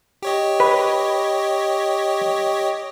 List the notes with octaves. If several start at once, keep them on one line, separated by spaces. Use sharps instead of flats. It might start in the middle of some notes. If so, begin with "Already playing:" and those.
G4 C#5 D#5
B4